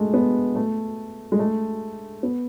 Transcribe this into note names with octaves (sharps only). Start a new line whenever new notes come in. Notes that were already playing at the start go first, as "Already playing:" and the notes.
Already playing: G#3 A3
B3
A3
G#3
A3
B3